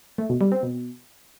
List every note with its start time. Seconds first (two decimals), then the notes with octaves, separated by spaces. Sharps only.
0.18 A3
0.29 B2
0.41 G3
0.52 C4
0.63 B2